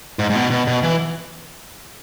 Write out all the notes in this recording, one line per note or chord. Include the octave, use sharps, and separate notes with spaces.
G#2
G#2
B2
B2
B2
E3